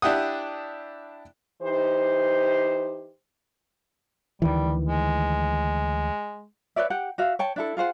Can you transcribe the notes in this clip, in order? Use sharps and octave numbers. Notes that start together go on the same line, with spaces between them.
D4 E4 G4 F#5 D#6
E3 D#4 G4 C5
D2 D#3 E3 G3
G#3
B4 C#5 D5 E5
G4 F#5 G5
F#4 E5 F5
C#5 G5 A5
D4 E4 A4
F4 G#4 C5 F#5